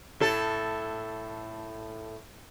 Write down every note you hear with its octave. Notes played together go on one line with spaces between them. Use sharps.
A2 A4